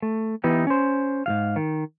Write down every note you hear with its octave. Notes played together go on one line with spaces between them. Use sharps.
A3
E3 B3 D#4 E4 G4
C#4 C5
G#2 F3 F5
D#3